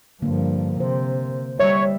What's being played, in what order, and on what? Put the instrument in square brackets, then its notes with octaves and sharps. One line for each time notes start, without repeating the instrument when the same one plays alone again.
[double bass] G2 F3 [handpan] D3 A#3
[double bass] C3 [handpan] C5
[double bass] G3 [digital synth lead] C#5 [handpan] E5